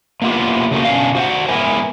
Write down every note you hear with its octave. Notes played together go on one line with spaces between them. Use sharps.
A#3 B3 E4 F4 G4
C#3 A3 A#3 F#4
B2 C#4 D4 F5
F#4 C5 F5 F#5
G#3 B3 E4 A#4 G#5